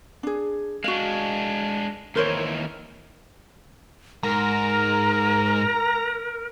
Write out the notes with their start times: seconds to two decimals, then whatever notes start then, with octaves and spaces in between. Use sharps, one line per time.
0.23 D4 G#4
0.84 G#3 D4 F#4 F5
2.16 D#2 E3 A#4 C5 C#5
4.23 G#2 A#4 A#5